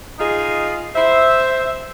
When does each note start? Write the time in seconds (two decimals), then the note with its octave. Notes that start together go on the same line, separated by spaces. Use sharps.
0.19 D#4 F4 G#4 D#5
0.96 C5 E5